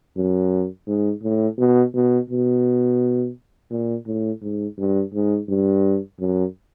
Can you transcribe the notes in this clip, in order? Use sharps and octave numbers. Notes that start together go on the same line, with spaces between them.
F#2
G#2
A2
B2
B2
B2
A#2
A2
G#2
G2
G#2
G2
F#2